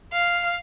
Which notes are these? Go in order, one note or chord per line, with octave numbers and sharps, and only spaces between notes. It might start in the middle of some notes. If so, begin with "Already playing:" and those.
F5